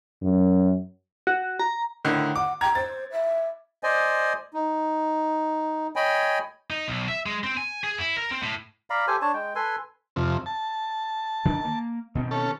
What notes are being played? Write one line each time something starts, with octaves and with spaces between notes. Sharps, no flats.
F#2
F#4
A#5
A2 D3 D#3
F#5 D6
G5 A#5 G#6
C5 A6
E5
C5 D5 D#5 G#5
D#4
C#5 D#5 G5 G#5 B5
D#4
B1
E5
G#3
C4
G#5
G#4
E4
A#4
C4
A2
D5 F5 A#5 B5
G4 A4 C5 G#5
D4 C#5 A5
G#3 G5
A4 B4 G#5 C6
F2 C3
A5
D#3 D4
A#3
B2 D#3 C4
C#4 A4